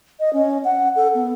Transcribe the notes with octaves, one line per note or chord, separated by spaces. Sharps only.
D#5
C#4
F#5
A4
B3